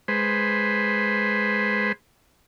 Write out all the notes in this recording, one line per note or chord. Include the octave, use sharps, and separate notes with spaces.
G#3 B4 C5